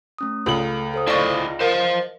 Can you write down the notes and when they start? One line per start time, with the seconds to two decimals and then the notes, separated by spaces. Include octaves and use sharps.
0.18 A3 C#4 D#6
0.46 C#2 A3 A4 B4 F#7
0.94 A4 C5 D#6
1.08 E4 D5 D#5 F5 A5 C#6 A#6
1.61 A#4 C5 F5